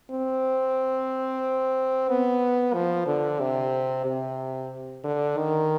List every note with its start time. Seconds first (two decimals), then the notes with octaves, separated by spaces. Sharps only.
0.11 C4
2.09 B3
2.74 F3
3.07 D3
3.40 C3
4.06 C3
5.04 D3
5.38 D#3